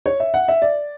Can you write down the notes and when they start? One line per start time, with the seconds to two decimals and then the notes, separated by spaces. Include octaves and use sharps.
0.06 C#5
0.20 E5
0.34 F#5
0.48 E5
0.62 D5